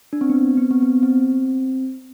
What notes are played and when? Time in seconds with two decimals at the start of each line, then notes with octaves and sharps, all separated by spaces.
0.13 D4
0.21 C4
0.29 B3
0.37 C4
0.58 B3
0.71 C4
0.82 B3
1.03 C4